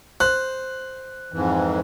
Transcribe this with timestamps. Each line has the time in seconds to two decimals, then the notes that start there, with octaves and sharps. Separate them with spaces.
0.20 C5 F#6
1.33 F2 G#2 E3